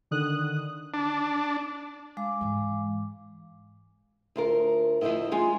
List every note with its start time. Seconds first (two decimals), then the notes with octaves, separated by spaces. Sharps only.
0.11 D3 D#3 D#6 F#6
0.94 D4
2.17 G#3 F5 D6
2.41 G#2 E3
4.36 D2 F4 A#4
5.02 D2 C3 F3 E4 D#5
5.31 G#3 F4 G#5